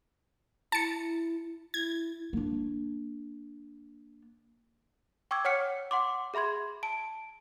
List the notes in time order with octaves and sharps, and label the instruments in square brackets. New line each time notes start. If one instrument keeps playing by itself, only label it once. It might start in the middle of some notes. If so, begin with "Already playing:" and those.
[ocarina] E4 [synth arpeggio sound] A5 C#7
[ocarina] E4 [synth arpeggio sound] G#6
[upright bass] A#3 D4
[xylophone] G5 C#6 D6 E6 G#6
C#5 F#5 F6 C#7
F#5 C6 D6
G#4 E5 B5 C6 G#6
A5 D7